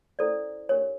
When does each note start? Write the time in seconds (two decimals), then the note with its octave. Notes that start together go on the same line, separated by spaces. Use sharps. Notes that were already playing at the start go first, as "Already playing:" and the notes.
0.19 C#4 E4 A4 C5 D5
0.69 D4 G4 A#4 C#5